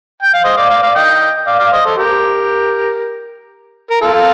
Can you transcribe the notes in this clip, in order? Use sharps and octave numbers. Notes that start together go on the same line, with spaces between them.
G5
F5
C5 D#5
D5 F5
D5 F5
D5 F5
D#5 G5
D5 F5
D5 F5
C5 D#5
A4 C5
G4 A#4
A#4
F4 A4